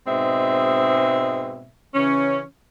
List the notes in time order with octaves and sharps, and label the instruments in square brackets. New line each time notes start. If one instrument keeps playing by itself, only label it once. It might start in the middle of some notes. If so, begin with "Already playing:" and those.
[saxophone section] G#2 B2 G#3 C4 E5
C#3 E3 C#4